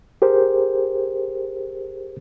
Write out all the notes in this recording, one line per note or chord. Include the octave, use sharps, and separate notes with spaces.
G4 G#4 A#4 C5